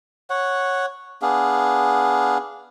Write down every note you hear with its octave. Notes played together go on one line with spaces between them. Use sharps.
C#5 F#5
B3 D4 G#4 F5